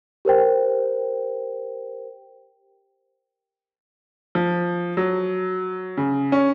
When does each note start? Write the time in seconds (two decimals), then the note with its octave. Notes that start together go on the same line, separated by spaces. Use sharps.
0.25 G4 A#4 C5 G5
4.35 F3
4.97 F#3
5.97 C#3
6.32 C#4